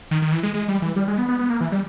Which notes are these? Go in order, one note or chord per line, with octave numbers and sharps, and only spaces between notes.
D#3
D#3
E3
G#3
G#3
G3
E3
G3
G#3
B3
B3
B3
A#3
E3
G3